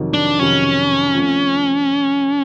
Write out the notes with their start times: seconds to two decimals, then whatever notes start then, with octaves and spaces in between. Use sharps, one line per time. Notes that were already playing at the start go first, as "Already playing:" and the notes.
Already playing: F2 C3 D#3 F#3
0.14 D4
0.39 F2 C3 D#3 F#3 C#4
1.14 F3 A3 C4